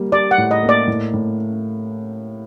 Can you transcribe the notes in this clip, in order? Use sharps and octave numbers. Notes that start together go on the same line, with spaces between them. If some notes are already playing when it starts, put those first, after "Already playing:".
Already playing: G3 A#3
G3 D5
F#5
A2
D#5
A#3
D5
A2
A2